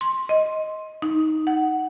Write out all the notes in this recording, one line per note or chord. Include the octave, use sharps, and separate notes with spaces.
C6
D#5
D#4
F#5